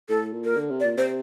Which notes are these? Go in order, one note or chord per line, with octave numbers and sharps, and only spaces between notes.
A2 A4
A#2
A#4
D3
C3
D5
A#2
C3 C5